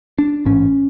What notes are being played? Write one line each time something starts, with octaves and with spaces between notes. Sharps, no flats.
D4
A1 G#2 C#4